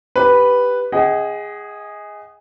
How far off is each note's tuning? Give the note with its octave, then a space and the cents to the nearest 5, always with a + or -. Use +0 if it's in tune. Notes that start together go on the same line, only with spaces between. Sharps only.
G4 -5 B4 +0
G#4 -10 D#5 +25 F#5 +40